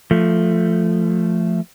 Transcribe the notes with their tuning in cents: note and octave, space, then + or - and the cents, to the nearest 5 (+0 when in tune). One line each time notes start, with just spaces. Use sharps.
F3 +0 A3 +5